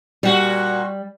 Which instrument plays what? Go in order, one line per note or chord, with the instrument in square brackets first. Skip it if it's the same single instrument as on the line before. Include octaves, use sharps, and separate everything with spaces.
[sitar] A#2 F#4 [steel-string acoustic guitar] G3